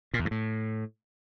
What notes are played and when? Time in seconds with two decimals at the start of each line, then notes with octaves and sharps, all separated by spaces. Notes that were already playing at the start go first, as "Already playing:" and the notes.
0.14 A#2
0.19 E2
0.25 G2
0.31 A2